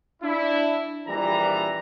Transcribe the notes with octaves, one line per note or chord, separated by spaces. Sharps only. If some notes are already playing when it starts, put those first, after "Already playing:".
D4 E4
A#1 E3 G3 A#5